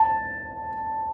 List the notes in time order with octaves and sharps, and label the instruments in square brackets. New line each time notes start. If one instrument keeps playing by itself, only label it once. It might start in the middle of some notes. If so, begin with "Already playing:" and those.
Already playing: [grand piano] A5